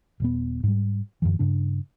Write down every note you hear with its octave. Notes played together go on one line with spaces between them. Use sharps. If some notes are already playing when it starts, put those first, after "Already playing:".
D#1 A#2 B3
G#2 G3
F#2 A2 D3 E3
G2 C#3 D4